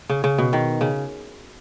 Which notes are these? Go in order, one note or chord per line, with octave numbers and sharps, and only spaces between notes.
C#3
C#3
B2
D#3
C#3